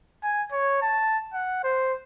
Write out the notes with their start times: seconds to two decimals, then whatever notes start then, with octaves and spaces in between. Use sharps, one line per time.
0.24 G#5
0.52 C#5
0.82 A5
1.33 F#5
1.64 C5